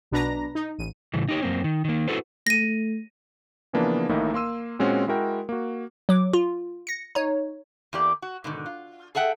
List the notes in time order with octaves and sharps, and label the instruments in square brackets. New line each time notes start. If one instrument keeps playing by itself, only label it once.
[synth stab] B1 B2 D4 B4 A#5 A#6
D#4
A1 D#7
[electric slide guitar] A2 C#3 E3
D#4 G4 C#5
F#2 A#3 C4
D#3
D#3 A#3
E4 F#4 A4 B4 C5
[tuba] A3 [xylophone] A#6 D#7
[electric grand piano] C#3 E3 F3 A#3 B3 D4
A1 A2 D#3 A#3 D#4 E4
A#3 C6 E6 D#7
A#2 G#3 C4 C#4 F#4
G#3 E4 F#4 A#4 G5
A#3 F#4
[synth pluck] F#3 D6
F4
A#6 C#7
D#4 C#5
[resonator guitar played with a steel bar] E2 A#3 G4 D5
F#4
G#2 B2 D3 D#3
F4
G#4 A4 E5 F#5 G5